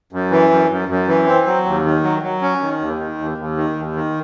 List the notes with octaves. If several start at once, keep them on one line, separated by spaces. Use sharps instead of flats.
F#2
E3
F#2
F#2
F#2
E3
C4
F#3
D#2
D#3
F#3
F#3
C#4
D#3
D#2
D#3
D#2
D#2
D#3
D#2
D#3